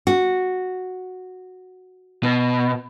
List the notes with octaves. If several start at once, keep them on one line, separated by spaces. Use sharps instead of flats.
F#4
B2